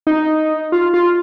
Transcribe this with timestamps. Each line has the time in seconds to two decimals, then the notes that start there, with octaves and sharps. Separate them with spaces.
0.07 D#4
0.72 F4
0.94 F4